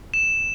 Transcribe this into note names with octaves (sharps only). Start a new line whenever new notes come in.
E7